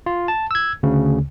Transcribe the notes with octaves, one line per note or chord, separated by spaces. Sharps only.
F4
A5
E6 G#6
D2 C#3